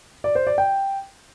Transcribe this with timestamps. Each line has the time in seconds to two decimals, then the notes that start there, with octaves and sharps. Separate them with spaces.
0.24 D5
0.35 C5
0.47 D5
0.58 G5